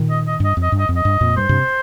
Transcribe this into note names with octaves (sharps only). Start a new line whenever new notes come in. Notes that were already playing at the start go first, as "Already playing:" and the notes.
Already playing: A#2 D#3
D#5
D#5
G2 D#5
F2
D#5
G2
D#5
F2
D#5
G2
F2 A#2
G2 C5
G2 C3